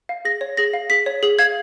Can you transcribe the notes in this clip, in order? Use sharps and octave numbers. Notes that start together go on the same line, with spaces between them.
F5
G#4 A#6
C#5
G#4 A#6
F5
G#4 B6
C#5
G#4
F5 G#6